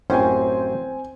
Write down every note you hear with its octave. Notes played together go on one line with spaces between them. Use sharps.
A1 F#2 C4 C#4 C5 G5 G#5